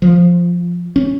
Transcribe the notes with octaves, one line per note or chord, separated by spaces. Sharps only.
F3
C#4